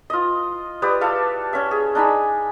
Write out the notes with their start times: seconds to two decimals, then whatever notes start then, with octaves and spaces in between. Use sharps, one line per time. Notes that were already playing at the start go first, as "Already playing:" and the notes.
0.10 F4 D#5
0.82 G4 B4 D5 D#6
1.01 A4 E5 F5
1.53 C#4 E5
1.71 G#4
1.95 D4 D#4 G#5 B5